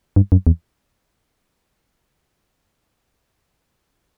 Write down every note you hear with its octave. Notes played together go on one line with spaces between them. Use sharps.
G2
F#2
E2